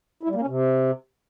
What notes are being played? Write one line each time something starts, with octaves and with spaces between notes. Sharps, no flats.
E4
G3
A#3
C#4
C3